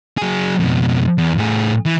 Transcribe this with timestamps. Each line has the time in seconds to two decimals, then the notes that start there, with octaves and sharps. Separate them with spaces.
0.18 F#3 G#4
0.60 F2 B2
1.18 E2
1.38 A2 G#4
1.86 E3